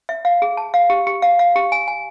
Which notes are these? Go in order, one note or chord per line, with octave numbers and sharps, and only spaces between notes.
E5
F5
G#4
A5
F5
G4
G4
F5
F5
G4
G#5
G#5